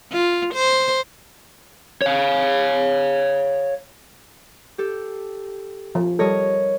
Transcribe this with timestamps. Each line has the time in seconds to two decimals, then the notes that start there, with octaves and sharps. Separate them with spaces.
0.12 F4
0.54 C5
2.02 C#5 F5
4.78 G4 A4
5.95 F3
6.19 G3 A4 A#4 C#5 D#5